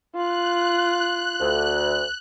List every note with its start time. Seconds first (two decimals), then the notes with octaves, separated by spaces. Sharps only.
0.15 F4 F#6
1.41 D2